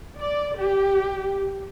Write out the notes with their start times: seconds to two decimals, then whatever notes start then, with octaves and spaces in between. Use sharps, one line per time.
0.19 D5
0.55 G4